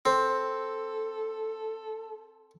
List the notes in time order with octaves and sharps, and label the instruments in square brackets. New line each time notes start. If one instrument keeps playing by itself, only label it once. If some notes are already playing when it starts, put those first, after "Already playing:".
[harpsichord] C4 [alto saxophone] A4